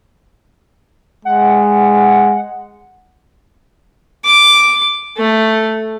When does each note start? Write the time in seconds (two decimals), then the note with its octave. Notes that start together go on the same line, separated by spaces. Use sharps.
1.25 G#3 F#5
4.25 D6
5.17 A3